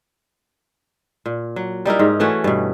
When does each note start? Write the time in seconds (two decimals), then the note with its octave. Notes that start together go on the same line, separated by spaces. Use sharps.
1.26 A#2
1.56 F#3
1.85 G3 D#4 E4 A#4
1.99 G#2
2.20 E3 A3 C#4 F#4
2.44 G2 B2